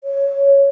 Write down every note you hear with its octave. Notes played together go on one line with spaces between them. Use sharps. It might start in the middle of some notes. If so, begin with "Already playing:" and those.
C#5